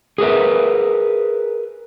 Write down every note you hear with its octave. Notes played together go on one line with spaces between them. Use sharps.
G#4 A#4 B4 E5